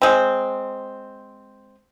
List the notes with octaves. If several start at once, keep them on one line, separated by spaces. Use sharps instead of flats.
G#3 C4